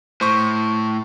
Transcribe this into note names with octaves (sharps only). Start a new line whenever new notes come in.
A2 C5 C#6